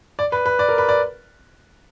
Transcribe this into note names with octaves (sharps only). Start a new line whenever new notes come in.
D5
B4
B4
D5
A#4
B4
D5